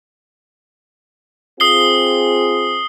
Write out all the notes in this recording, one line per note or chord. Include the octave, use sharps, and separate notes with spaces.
C4 F4 G#4 D#6 C7 G7